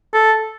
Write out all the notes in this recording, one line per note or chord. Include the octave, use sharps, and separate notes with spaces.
A4